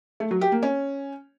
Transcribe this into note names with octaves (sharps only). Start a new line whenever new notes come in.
A3
F#3
G4
A#3
C#4